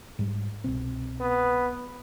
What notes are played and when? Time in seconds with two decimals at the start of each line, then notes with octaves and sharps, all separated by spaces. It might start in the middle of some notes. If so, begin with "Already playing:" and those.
0.19 G#2 G3
0.64 C2 B2 C4
1.21 B3